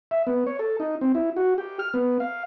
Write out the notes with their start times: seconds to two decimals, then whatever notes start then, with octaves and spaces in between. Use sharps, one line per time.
0.11 E5
0.27 B3
0.47 C#5
0.59 A4
0.80 D#4
1.01 C4
1.15 E4
1.36 F#4
1.58 G4
1.79 F6
1.94 B3
2.20 F5